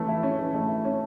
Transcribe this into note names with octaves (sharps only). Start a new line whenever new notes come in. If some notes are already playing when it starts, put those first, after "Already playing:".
Already playing: E3 A3 C#4
E4
C#4
E3
A3
E4
C#4